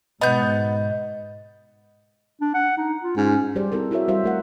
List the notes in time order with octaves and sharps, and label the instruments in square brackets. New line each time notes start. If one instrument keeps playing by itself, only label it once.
[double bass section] G#2 B2 [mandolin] B3 F#5 G6 [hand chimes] D#5
[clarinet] D4
F#5
D#4
F4
[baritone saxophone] G#2 [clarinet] C#4
[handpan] G3 G4 G#4 C5 D5
C4 E4 G4 A4 A#4
E4 F#4 A#4 C#5 E5
G3 F#4 C5 E5 F5
A3 A#4 F#5